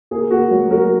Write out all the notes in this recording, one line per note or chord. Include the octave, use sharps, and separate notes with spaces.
A#3 G#4
A#3 F#4
F#3
F#3 F#4 A#4